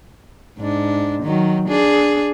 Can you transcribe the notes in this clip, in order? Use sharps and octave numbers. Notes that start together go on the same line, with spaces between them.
G#2 D4
D#3 F#3
D4 G#4